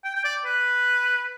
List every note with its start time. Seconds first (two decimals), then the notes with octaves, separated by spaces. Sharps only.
0.05 G5
0.15 G5
0.25 D5
0.45 B4